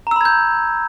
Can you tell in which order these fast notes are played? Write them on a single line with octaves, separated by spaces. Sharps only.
A#5 E6 B5 G#6 G6